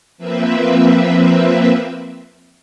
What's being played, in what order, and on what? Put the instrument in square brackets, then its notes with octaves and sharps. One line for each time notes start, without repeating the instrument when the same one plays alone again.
[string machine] F3 A#3 C4 B4 E5